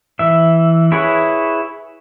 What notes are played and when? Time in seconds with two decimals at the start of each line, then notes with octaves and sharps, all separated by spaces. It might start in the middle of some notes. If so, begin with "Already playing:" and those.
0.19 E3 E5
0.92 E4 G#4 B4 C#5 F#5